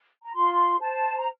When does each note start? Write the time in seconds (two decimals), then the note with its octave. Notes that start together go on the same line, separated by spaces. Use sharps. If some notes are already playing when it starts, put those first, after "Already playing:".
0.24 A#5
0.35 F4 C6
0.81 C5 A5
1.18 A#5